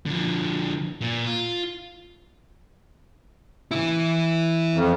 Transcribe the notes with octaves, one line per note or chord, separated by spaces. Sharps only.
D3 F3
A#2
F4
E3 E4
F2